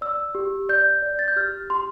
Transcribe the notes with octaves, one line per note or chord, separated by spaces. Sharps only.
D5 E6
G4
D5 G6
D5
A6
G6
G4 F6
G4 C6